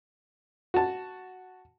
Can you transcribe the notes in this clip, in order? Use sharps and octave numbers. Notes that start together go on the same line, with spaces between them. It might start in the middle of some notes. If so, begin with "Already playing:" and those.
F#4 A5